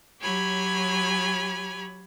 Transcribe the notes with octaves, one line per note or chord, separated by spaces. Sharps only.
F#3 G4 C#5 G#5 B5